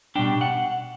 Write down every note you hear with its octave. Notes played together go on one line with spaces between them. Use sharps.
B2 G3 D4 G5
F#5